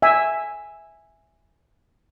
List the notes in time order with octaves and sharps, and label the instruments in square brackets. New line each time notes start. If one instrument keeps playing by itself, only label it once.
[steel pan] E5 G#5